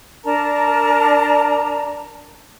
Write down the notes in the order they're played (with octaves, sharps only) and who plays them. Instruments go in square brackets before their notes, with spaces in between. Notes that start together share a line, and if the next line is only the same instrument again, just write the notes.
[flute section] D4 A#4 A5 A#5